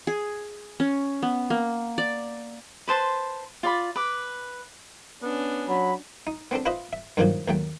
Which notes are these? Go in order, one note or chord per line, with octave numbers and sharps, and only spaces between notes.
G#4
C#4
B3
A#3
D5
B4 C5 A5 C6
F4 D5 B5
B4 D6
B3 C#4 D4
F#3 B5
D#4
B3 C4 D4 A4
F4 B4 C5 D#5 E5
E5
G2 A#2 D3 D#3 F3 F#3
D#2 F#3 A3 G5